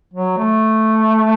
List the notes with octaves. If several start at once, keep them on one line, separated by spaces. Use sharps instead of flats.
F#3
A3